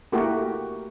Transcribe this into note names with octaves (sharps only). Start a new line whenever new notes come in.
A3 A#3 E4 F#4 G4 A#4